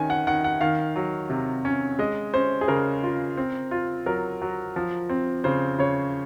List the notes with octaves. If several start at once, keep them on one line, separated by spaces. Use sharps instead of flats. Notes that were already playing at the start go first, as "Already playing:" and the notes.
Already playing: D#3 C#4 G#5
F#5
D#3 F#5
F#5
D#3 F5
F#3
C3
C#4
G#3 D#5
C#4 C5
G#4
C#3 A#4
F4
C4
F4
F#3 A#4
F#3
F3
C4
C#3 C5
C#3 C#5